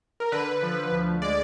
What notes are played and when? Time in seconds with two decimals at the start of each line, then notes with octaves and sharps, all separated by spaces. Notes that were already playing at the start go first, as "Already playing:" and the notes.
0.20 A#4
0.32 D3 B4
0.63 F3
0.92 D2
1.22 G#3 D5